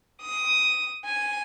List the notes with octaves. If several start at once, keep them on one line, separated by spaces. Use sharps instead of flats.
D#6
G#5